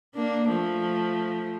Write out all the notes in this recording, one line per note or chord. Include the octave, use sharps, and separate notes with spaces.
A#3 D4
F3 A3